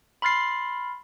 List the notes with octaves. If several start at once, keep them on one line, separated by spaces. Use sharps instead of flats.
B5 C6 F6 A6 C7